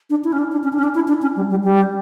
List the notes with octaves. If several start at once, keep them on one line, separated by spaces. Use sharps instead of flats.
D4
E4
C#4
D4
D4
C#4
D4
C#4
D4
E4
D4
C#4
G3
G3
G3